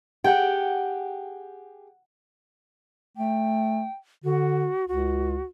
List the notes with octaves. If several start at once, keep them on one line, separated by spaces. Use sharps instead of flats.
G4 G#4 F#5 G5
A3 G5
D3 F#4
C#2 F#4